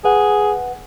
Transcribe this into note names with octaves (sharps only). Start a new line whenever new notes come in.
G#4 B4 F#5